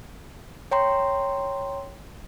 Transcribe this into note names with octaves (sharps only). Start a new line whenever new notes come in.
C#5 G5 A#5 C6